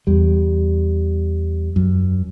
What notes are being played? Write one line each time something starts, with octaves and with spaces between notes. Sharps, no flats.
E2 G3
F#2